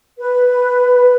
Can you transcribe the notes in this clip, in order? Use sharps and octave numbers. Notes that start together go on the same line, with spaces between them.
B4